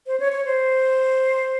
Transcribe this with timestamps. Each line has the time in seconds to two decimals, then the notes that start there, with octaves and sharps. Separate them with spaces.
0.07 C5
0.20 C#5
0.32 C#5
0.45 C5